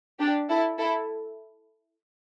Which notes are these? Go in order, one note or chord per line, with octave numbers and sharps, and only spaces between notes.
D4 G4
E4 A4
E4 A4